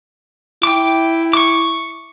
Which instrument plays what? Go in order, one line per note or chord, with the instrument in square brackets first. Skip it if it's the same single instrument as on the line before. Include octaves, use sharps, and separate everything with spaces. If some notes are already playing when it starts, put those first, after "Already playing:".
[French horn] E4 [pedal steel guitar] G5 D6
[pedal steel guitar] C#6 D6